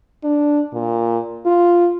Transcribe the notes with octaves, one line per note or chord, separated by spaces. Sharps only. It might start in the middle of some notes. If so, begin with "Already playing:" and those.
D4
A#2
F4